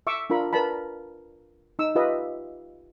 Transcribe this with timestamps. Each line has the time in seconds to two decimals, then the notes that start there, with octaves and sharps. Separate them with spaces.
0.07 E5 C#6 D6 E6
0.30 D4 F4 A#4 B5
0.53 A#4 B4 D5 A5 B5
1.79 D#4 E6
1.95 F4 G4 B4 D#5 E5